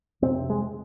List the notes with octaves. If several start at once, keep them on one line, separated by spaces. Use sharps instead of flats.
F2 C3 C4
G#3